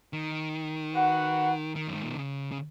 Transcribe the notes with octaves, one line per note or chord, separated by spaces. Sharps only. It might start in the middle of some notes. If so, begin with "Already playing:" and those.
D#3
F#4 B4 F#5
D#3
F#2
G#2
A#2
B2
C#3
C#3